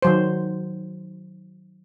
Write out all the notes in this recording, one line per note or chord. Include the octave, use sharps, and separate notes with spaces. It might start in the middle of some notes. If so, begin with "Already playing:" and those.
D#3 F#3 C5